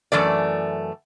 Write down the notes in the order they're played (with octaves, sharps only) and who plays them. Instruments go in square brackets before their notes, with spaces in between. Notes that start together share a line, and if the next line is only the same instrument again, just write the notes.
[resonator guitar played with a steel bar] F#2 E3 A3 D5